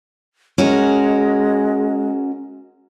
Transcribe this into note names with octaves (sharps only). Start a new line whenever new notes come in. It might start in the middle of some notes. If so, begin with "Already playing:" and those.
G#3 C#4 F#4 A#4